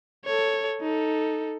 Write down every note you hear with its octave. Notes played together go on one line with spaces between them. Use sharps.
A4 C#5
D#4 A4